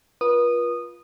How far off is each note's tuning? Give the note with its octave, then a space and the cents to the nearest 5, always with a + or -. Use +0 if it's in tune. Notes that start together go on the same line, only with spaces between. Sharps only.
F4 +0 B4 -40 D#6 -15